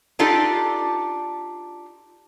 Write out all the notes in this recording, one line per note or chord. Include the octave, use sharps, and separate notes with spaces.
D4 D#4 F4 G4 A4 D5